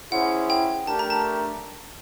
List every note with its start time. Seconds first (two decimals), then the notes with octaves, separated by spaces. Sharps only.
0.11 C#4 E4 G#4 C5 F#5
0.50 G5
0.87 A3 D4 G4 A#4 A5
0.99 A#5
1.10 A5